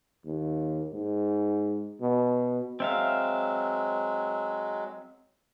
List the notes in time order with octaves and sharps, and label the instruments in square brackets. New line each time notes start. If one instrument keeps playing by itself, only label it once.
[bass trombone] D#2
G#2
B2
[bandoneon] F#3 G#3 [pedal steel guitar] C4 E5 F5